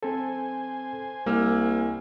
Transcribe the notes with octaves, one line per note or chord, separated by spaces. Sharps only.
C4 A4 C5 G#5
C2 G3 A#3 E6 F6